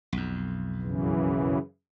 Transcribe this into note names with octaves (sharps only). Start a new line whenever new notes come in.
B1 F2
F#2 C#3 E3